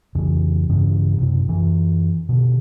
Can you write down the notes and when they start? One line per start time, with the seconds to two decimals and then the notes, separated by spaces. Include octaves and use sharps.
0.15 F2 C#3 E3
0.69 G2 C#3 E3
1.18 F#2 C3
1.49 F#2 E3
2.29 B2 D3